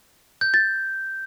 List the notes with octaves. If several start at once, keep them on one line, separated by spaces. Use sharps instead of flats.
G6
A6